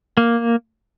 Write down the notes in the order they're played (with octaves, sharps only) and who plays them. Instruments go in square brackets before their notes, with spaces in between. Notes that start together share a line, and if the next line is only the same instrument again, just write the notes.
[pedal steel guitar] A#3